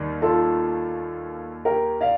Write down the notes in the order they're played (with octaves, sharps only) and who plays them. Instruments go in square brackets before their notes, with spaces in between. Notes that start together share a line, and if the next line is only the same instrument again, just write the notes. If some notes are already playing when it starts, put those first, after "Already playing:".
Already playing: [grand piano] D#2 D#3 G3
[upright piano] F4 A4
G4 A#4
D5 F5